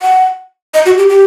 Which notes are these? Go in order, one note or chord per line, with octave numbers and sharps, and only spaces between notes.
F#5
D#5
F#4
G4
G4